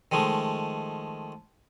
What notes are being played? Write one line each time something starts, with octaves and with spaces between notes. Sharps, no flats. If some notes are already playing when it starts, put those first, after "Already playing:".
D#3 F3 G#3 A3